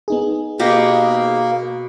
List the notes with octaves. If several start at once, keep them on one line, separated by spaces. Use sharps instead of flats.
B3 D#4 G#4
B2 A#3 G4 D#5